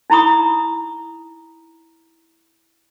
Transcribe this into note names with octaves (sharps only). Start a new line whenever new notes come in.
D#4 E4 A#5 B5 C#6 D#6